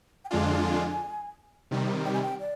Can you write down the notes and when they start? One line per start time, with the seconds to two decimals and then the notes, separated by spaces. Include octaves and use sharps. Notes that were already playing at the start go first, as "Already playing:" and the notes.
0.25 G5
0.30 F2 D3 G#3 D4 F4 G#5
1.71 C3 D#3 G3
2.05 G5
2.13 G#5
2.22 G5
2.40 D5